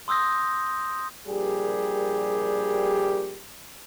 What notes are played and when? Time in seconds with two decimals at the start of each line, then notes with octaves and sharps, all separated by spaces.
0.08 C6 D#6 E6 G6 A#6
1.28 A#1 G3 G4 G#4 A#4